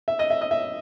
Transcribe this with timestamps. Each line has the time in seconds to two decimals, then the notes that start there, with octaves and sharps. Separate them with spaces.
0.08 E5
0.19 D#5
0.30 E5
0.41 D#5
0.51 E5